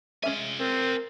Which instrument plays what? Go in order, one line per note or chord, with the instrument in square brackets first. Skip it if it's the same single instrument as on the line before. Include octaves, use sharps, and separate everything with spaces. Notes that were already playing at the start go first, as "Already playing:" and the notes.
[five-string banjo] G#3 C#4 E5 [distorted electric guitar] F4 G#5
[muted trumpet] C4 [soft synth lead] A#4